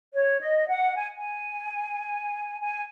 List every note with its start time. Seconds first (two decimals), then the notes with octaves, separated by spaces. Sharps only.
0.13 C#5
0.41 D#5
0.68 F#5
0.95 G#5
1.17 G#5
2.60 G#5